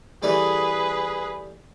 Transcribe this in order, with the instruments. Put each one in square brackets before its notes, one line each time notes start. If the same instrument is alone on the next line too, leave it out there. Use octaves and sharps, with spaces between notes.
[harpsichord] E3 G3 A3 [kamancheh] G#4 B4